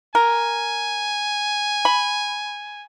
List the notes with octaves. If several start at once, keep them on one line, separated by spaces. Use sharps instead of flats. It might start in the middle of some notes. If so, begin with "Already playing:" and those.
A#4 G#5
B5